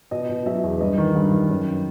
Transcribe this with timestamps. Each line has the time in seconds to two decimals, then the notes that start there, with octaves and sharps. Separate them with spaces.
0.11 B2 D#5
0.29 B2
0.46 F#3 E5
0.63 E2
0.80 G2 D#5
0.98 D#3
1.15 G2
1.32 D#3
1.49 F#2